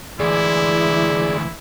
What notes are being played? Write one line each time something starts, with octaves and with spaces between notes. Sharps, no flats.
D2 E3 G#3 E4 G#4 D5